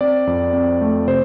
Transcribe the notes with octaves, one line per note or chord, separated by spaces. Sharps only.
C4 D5
F2
C4
A3
C3 C5